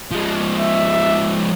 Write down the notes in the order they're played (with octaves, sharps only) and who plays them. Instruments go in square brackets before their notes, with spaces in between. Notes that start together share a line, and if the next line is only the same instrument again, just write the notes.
[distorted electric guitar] F3 G#3
[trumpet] E5